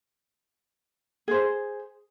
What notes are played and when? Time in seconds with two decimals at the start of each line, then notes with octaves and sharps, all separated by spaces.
1.28 G#4 C5